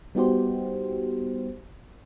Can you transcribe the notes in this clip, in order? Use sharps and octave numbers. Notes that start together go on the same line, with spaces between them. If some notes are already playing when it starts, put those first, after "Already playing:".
G3 B3 D#4 F#4 G4 C5